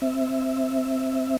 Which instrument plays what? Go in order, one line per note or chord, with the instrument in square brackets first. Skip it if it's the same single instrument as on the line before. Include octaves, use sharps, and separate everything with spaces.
[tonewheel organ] C4 E5